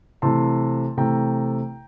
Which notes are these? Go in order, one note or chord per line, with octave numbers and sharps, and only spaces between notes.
C3 E3 A3 A5 C6
C3 E3 A3 G5 A#5